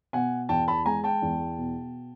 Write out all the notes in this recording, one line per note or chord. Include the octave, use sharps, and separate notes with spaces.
B2 F#5 G#5
E2 G5 A5
A5 B5
G#3 G#5 A#5
G5 A5
E2
B2